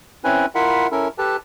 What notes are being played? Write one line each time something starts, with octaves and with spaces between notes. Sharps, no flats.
C4 C#4 E4 B4 G#5
E4 F4 A#4 E5 F#5 B5
C#4 E4 A4 A#4
G4 A4 B4 A5